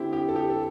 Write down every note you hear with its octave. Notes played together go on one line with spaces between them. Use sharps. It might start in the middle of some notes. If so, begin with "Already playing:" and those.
Already playing: D3 C4 E4 G4
G4
A4
G4
A4